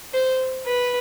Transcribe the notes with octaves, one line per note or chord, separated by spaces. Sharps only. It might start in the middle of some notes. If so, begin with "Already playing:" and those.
C5
B4